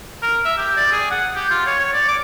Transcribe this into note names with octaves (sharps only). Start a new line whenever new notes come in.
A#4
E5
G4
D5
G#4
F#5
G4
F4
C#5
C#5
D5
D6